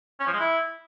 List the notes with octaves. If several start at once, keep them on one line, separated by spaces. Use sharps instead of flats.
C#4
F3
G#3
E4